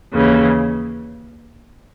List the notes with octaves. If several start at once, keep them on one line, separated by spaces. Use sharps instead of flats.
D#2 C#3 E3